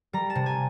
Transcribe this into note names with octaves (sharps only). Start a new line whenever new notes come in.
G3 A#5
A5
C3
G#5